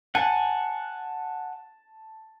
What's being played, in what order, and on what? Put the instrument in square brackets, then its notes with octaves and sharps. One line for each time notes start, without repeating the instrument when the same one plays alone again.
[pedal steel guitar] F#5 G#5 [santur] A5